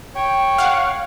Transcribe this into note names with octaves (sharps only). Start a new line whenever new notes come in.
C#5 G5
F5 F#5